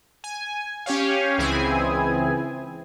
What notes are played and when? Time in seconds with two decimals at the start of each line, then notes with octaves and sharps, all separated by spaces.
0.24 G#5
0.86 C#4 G4 C#5 F5
1.38 C#2 E3 C4 E4 G#4 G#5